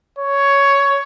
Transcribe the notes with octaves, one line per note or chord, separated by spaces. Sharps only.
C#5